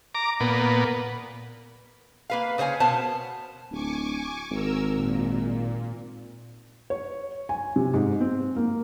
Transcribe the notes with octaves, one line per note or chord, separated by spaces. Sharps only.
A#5 D6
A#2 B3
A#3 B4 F5
C#3 C5 C#5 F5 G#5
B2 B3 A#4 C5 A5
D1 G#5 C#6 D6
G#1 A#4 E6
A#2
C#5
G#5
C3
G#2
C4
A#3